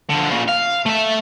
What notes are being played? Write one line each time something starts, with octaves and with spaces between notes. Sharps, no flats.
D3 F3
A#2 C#3
F5
A3 E5